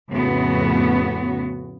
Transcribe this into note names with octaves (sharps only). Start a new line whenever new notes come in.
F2 A2 C#3 B3 F#4